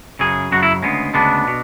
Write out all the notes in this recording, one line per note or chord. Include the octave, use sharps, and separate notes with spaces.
F#2 C#3 F#3 G#4
F#2 C#3 F#3 F#4
E4
D2 C#3 G#3 B3
D2 C#3 G#3 B3 D4
B2